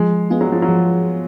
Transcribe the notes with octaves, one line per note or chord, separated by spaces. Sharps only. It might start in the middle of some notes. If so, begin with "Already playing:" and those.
Already playing: F3 G#3
G#3 B3 F4
F#3
F3
F#3
F3